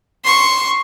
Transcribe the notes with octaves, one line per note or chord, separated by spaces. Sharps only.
C6 C#6